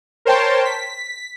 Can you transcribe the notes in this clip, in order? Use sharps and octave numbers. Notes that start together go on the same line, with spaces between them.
A#4 C5 C#5 G5 A5 C6
B6